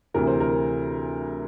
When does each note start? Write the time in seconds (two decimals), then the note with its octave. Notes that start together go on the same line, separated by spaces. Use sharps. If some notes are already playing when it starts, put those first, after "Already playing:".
0.14 D2 C3 E3 A#4
0.27 C5
0.40 A#4